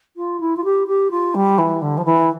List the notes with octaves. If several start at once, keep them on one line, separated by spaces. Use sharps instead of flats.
F4
E4
F4
G4
G4
F4
G3
E3
D3
F3
E3